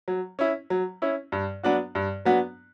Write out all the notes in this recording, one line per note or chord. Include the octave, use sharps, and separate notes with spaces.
F#3
C#4 E4
F#3
C#4 E4
G2
F#3 B3 D4 F#4
G2
F#3 B3 D4 F#4